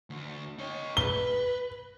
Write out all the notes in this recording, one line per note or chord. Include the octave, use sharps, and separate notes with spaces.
D2
D#4 C#5
B4 G7